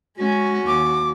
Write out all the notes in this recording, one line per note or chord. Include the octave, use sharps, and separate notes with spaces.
G#3 C#4 F#4
D#2 D6